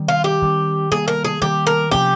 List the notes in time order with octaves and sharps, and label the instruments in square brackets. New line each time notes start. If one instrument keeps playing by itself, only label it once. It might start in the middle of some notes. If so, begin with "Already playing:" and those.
Already playing: [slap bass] D#3 G3 C4
[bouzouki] F4
G4
[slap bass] D#3 G3 C4
[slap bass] D#3 G3 A#3 [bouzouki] G#4
[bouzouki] A#4
G#4
[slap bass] D#3 G3 A#3 [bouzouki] G4
[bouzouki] A#4
[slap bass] C3 F3 A#3 C#4 [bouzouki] G4